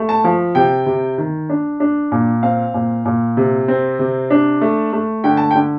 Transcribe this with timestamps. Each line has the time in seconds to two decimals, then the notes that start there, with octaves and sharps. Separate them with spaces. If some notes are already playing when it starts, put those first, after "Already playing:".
Already playing: A3
0.09 A5
0.24 F3
0.55 C3 G5
0.86 C3
1.18 D#3
1.49 D4
1.80 D4
2.12 A#2
2.43 C4 F5
2.74 A#2
3.05 A#2
3.37 C3
3.68 C4
3.99 C3
4.30 D4
4.61 A3
4.93 A3
5.24 D3 G5
5.37 A5
5.51 G5
5.55 D3